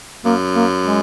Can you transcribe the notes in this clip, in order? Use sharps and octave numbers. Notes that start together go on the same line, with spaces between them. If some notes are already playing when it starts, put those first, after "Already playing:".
F#2 A#3
A#3
G#3